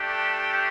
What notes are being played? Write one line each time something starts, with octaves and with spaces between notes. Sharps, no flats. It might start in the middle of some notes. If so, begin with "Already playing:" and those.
Already playing: A3 D4 G4